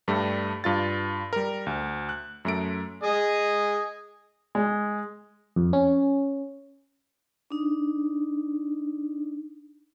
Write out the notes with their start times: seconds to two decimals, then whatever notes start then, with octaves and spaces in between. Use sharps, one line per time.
0.08 G2 G3 A3
0.64 G2 F4 A6
1.33 G3 A#4
1.66 D2
2.09 F#6
2.45 F#2 A3 D7
3.04 G#4 D#5
4.55 G#3
5.56 F2
5.73 C#4
7.51 D4 D#4